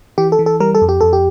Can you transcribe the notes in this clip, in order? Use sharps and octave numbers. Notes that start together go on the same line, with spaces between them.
E3 G4
A4
E3
A4
G3 A#4
A4
F2
G4
F2 A4
G4